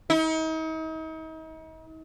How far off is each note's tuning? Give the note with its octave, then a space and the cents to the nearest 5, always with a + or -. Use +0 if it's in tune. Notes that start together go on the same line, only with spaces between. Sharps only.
D#4 +40